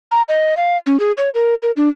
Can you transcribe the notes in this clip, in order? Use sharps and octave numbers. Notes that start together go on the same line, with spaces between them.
A#5
D#5
F5
C#4
G#4
C#5
A#4
A#4
D4